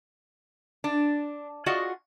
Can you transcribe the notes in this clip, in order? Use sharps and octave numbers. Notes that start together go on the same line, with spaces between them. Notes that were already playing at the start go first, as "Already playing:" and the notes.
D4
F4 F#4 G#4 D5 D#5 F#5